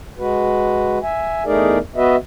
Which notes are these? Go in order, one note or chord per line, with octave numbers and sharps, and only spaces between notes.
G#3 F#4 B4
E5 G#5
E2 A3 D#4 G#4 A#4 D5
B3 F#4 B4 D#5 E5